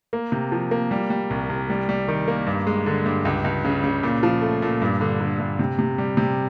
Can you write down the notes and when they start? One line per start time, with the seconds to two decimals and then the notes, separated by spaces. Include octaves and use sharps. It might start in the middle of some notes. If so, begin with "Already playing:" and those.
0.13 A#3
0.32 C3
0.52 F3
0.71 A#3
0.91 G3
1.10 G3
1.30 C2
1.50 C2
1.70 G3
1.89 G3
2.08 D#3
2.28 A#3
2.47 G2
2.67 G#3
2.86 D3
3.06 G2
3.25 C#2
3.44 C#2
3.65 C#3
3.84 C#3
4.03 A#2
4.23 F3
4.42 A3
4.62 A#2
4.82 G2
5.01 D3
5.20 D3
5.40 G2
5.59 C3
5.79 C3
5.98 G3
6.17 C3